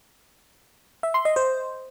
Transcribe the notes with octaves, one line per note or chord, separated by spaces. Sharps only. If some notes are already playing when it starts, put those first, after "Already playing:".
E5
C6
D#5
C5